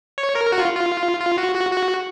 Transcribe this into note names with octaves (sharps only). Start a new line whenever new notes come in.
C#5
A#4
F#4
F4
F4
F4
F#4
F#4
F#4